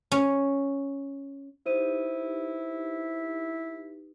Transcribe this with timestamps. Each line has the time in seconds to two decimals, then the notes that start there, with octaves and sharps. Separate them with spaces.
0.12 C#4
1.66 D#4 E4 G4 B4 C5 D#7